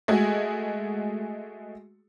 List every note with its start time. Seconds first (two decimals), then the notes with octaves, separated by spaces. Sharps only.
0.08 G#3 A3 F#4 G#4